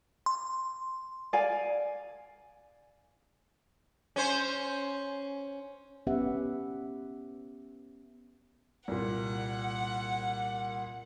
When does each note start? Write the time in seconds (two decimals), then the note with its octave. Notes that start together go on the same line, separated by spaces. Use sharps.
0.26 C6
1.33 D5 F5 G#5
4.16 C#4 C5
6.07 B3 C#4 G4 B4 E5 F#5
8.88 C2 A#2 F#5